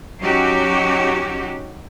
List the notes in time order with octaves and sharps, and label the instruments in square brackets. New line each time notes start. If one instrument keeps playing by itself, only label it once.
[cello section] F#3 C#4 D#4 F#4 G4